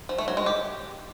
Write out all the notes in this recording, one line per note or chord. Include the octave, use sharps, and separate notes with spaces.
F3
A3
F#3
G#3
G4